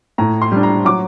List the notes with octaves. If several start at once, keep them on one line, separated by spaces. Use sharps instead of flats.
A2 A#5
C6
G3 D4
A#5
F#3 D6